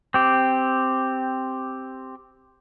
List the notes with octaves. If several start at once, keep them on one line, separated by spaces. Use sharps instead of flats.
C4 G4